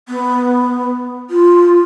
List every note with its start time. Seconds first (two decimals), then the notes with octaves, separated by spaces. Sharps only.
0.09 B3
1.30 F4